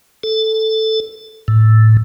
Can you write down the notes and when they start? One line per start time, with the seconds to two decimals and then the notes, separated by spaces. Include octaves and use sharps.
0.23 A4
1.48 A2